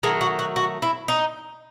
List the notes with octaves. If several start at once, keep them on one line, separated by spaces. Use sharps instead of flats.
D#3 F#3 A3 G#4
F#4
F#4
F#4
E4
D#4